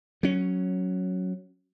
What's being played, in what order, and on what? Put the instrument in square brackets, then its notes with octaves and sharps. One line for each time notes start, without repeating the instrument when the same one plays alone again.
[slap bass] F#3 C#4